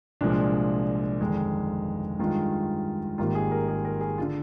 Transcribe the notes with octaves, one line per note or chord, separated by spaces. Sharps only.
C2 A#2 F3 G#3 D4
G1 F2 D#3 G#3
G2 D#3 G#3 F4
G#1 G#2 D#3 G3 A#3 F4
G#4
A#4
G#4
A#4
G#4
F4
D3